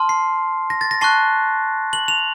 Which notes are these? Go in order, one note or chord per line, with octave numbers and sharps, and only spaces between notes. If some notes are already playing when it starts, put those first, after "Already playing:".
Already playing: A5 C6 F6
C7
A#6
A6
A#6
A5 C#6 F#6 C7
F#7
F7